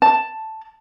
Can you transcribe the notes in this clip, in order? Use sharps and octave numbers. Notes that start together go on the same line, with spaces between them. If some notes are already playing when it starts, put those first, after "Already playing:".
A5